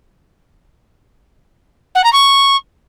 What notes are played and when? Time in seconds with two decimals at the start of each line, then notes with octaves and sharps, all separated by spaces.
1.95 F#5
2.04 A#5
2.13 C#6